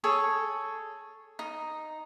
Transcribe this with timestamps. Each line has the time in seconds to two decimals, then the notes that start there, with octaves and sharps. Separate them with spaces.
0.04 G#4 A4 C#5
1.39 D#4